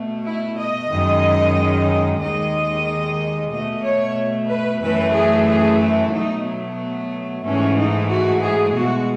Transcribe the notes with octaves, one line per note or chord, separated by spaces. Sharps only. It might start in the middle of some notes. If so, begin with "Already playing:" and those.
Already playing: B2 A3
E4
D#5
F#2 D#3 G#3
D#2 D#3 G#3 D#5
B2 A3 D#5
C#5
B4
F#2 E3 A3 B4
G#4
G#4
E4
B2 F#3 A3 D#4
B3
G#2 E3 A3 C#4
D#4
F#4
G#4
B2 G#3 F#4